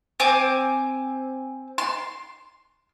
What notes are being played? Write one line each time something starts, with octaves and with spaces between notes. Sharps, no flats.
C4 G#5 D6
C6